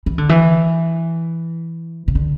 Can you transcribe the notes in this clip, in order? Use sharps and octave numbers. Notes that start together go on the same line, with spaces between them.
E3
D3
E3
C3
D3